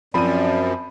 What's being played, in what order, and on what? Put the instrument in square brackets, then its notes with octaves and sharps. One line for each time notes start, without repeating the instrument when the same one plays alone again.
[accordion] F#2 [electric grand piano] F3 C4 [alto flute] D5 [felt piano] B5 D#7